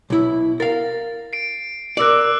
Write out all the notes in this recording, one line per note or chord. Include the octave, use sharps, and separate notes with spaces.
B1 E4
A#4 F5 A6
C7 D7
A#4 D5 D6 E6 F#6